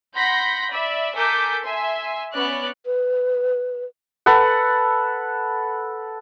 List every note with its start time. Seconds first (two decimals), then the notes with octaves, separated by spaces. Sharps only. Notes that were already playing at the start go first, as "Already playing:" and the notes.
0.16 F#5 B5 C6 G6 A#6 B6
0.70 D5 E5 B5
1.16 A4 A#4 G#5 D6 G6 B6
1.65 E5 G#5 C6
2.34 B3 C#4 D5 F#6
2.86 B4
4.26 A4 B4 F#5